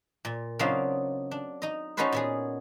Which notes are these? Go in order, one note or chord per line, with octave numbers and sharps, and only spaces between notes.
A#2
C#3 F#3 C4 D4 D#4 F4
D4
D#4 D#5
C#4 D#4 F#4 A4 B4 C5
A#2 B3 G#4